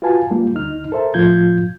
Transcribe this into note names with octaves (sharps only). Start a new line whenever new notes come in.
F4 F#4 B4 F5 G#5 A5
G3 A#3 F4
D2 D#4 F6
A4 A#4 C5 E5 A5
A2 F3 F4 G6 G#6